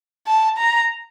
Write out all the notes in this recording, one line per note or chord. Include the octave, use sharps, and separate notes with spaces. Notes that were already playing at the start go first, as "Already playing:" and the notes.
A5
A#5